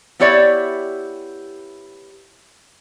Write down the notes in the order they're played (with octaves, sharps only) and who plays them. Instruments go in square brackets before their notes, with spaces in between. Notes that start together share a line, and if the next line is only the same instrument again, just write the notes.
[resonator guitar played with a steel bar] B3 E4 G4 C#5 D5 E5